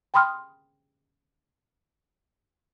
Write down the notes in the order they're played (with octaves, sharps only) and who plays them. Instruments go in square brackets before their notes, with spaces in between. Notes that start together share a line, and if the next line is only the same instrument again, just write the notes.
[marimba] G5 B5 C6 D#6 F6